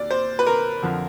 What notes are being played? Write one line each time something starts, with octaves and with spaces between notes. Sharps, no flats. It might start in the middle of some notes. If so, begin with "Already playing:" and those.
Already playing: D#2 D5
C5
B4
A#4
F2 D3 F3